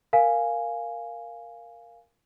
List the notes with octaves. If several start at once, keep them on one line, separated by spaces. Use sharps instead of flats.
A#4 F5 G#5